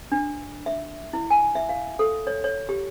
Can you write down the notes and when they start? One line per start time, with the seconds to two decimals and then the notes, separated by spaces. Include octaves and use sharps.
0.12 D4
0.66 E5
1.13 E4
1.30 G#5
1.55 E5
1.69 F5
1.99 A4
2.27 C#5
2.44 C#5
2.69 G4